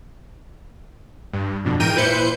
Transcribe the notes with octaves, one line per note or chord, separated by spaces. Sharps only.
G2
F2 B2 D3
G#2 E3 A#4 G5 D#7
A#2 E4 B4 C5 G6 C#7